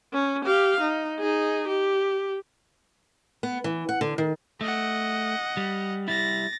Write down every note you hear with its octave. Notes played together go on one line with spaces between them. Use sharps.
C#4
G4 F5
D#4
D#4 G#4
G4
B3
E3
F#5
D3
D#3
A3 D#5 F#5
G3
G3 E4 A6 A#6